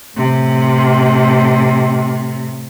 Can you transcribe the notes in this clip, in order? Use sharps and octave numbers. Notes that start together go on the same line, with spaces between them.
A2 C3